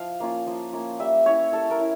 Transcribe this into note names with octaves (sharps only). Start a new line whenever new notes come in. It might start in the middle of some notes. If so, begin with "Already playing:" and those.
Already playing: F3 F5
A#3 C#4 F4
F3
A#3 C#4 F4
G3 E5
C#4 E4 C#5
G3 A4
A#4
C#4 E4